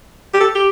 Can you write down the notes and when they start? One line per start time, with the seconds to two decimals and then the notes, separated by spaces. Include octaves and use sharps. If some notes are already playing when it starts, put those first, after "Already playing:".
0.34 G4
0.40 A4
0.55 G4